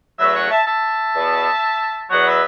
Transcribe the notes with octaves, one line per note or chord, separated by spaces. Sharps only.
E2 C#3 F#3 A3 C#4 B4 E5
C#5 F#5
E5 A5
E5 A5
E2 B2 B3
E2 B2 F#3 B3 C#5 F#5
B4 E5